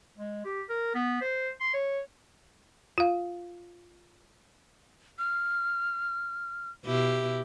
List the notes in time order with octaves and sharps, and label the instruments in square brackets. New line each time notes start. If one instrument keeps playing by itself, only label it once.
[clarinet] G#3
G4
A#4
B3
C5
C6
C#5
[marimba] F4 F5
[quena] F6
[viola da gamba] B2 E4 G4